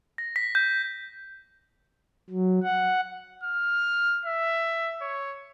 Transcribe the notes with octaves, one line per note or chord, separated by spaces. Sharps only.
A#6
B6
G6
F#3
F#5
F6
E5
C#5